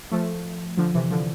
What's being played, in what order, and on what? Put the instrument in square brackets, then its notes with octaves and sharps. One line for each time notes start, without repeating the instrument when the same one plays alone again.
[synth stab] F3 A3
D3 F3
C3 E3
D3 F3